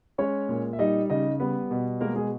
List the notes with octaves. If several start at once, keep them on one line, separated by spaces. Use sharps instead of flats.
G#3 C#4 C#5
A#2
E5
G3 D#4 D#5
C#3 D#4 D#5
G3 B3 B4
B2
G#3 A#3 A#4
G#3 G#4